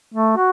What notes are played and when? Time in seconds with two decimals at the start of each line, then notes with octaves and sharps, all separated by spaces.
0.14 A3
0.37 F#4